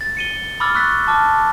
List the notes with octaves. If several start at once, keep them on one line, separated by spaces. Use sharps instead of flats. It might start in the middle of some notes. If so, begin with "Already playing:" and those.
A6
C#7 D#7 G7
B5 D6 E6 F6 A6
C#6 E6 F#6 A6 B6
A5 D6 F6